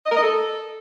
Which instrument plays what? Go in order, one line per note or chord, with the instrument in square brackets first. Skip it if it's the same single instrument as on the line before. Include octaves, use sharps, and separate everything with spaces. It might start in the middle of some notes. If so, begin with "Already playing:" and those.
[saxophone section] D#5
A#4
D#5
A4